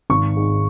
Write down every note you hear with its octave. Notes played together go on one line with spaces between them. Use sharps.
G#1 C#6
G#2